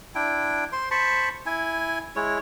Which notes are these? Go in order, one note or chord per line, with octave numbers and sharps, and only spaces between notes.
D4 E4 G5
C5 C6
C5 A5 B5 C#6
E4 G#5
G#3 E4 C#5